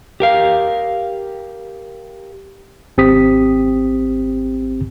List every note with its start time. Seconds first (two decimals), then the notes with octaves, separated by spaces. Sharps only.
0.20 G4 A#4 F5
2.98 G#1 C4 G4 D#6 B6